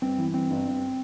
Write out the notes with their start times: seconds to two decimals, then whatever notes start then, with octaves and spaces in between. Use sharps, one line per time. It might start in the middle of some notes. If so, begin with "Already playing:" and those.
0.02 G1 C4
0.18 E3
0.34 G1 C4
0.50 G1
0.66 G2